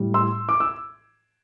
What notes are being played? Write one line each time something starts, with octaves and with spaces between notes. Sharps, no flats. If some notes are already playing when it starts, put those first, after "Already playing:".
Already playing: A2 G3
C6 E6
D6
E6